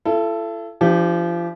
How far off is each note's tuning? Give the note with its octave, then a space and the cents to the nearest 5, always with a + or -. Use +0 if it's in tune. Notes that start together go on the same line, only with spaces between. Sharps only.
E4 +45 A4 +0
F3 -30 D4 +5 G4 +0